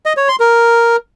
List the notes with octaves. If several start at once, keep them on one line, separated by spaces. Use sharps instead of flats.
D#5
C#5
C6
A#4